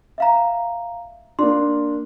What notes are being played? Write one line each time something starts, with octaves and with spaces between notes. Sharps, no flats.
E5 F5 A#5
A#3 D4 C6